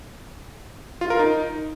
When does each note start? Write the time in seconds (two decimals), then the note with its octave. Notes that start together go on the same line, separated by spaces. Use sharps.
1.01 F4
1.10 A#4
1.19 D#4